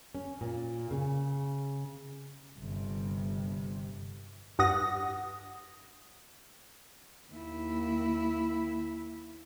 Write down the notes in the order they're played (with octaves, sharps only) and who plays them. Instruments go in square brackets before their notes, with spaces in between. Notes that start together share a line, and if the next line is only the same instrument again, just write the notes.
[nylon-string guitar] C#4
A#2
C#3
[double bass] G1 C3
[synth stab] G2 F#5 D#6 A#6
[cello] D#2 E4